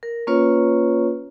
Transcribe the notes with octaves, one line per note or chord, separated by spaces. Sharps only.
A#4
A#3 C#4 F4 B4 C#5